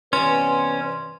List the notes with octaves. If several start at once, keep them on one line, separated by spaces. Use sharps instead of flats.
G2 C3 E3 B3 C#4 B4 C6